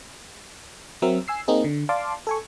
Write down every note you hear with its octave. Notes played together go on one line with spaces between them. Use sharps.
F#3 C4 A#4 E5
G#5 E6 C7
A#3 C4 D#4 G#4
D3
D5 F5 A5 C6 D6
A4 G#5 C#6